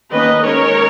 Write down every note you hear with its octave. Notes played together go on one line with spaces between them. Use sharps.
D#3 A#3 C#4 B4 D#5
D#3 G#3 C#4 A#4 C#5